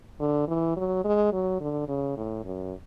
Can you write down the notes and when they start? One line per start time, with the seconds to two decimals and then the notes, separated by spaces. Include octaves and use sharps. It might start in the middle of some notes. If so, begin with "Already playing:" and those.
0.20 D3
0.48 E3
0.77 F#3
1.04 G#3
1.33 F#3
1.61 D3
1.88 C#3
2.17 A2
2.44 F#2